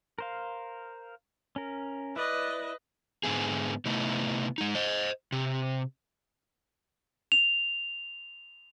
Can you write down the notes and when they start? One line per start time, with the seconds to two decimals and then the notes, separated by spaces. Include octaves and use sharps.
0.19 A#4 C5 F5
1.56 C#4 A#4
2.16 E4 B4 D5 D#5
3.23 G#2 D3 B3 G#4
3.85 C3 A3 B3 D#4 E4
4.58 G#3 D#4
4.75 C5 D#5
5.32 C3
7.32 F7